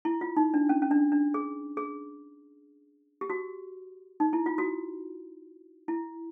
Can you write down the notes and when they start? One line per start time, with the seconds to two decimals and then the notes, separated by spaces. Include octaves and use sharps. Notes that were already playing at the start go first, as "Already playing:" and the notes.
0.05 E4
0.21 F4
0.37 D#4
0.54 D4
0.69 C#4
0.82 C#4
0.91 D4
1.12 D4
1.34 G#4
1.77 G#4
3.21 G4
3.30 F#4
4.20 D#4
4.33 E4
4.46 F4
4.58 F#4
5.88 E4